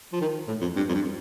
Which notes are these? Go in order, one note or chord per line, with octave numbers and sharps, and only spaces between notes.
F3
D#3
A2
F2
G2
F2
G2